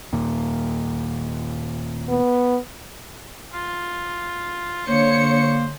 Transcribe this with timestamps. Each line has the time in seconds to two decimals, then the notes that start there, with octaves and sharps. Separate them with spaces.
0.13 D#2 A#2
2.09 B3
3.53 F4
4.87 D3 A#3 C5 C#5 C#7